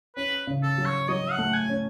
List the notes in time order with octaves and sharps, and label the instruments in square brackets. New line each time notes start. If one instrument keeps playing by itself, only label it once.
[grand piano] C#4 [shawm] B4
[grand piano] C#3
[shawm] A4
[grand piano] F#3
[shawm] C#5
[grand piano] F#3 [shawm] D#5
[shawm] F#5
[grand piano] A3
[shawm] G#5
[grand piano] C#4